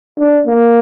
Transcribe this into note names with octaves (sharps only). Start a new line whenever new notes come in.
D4
A#3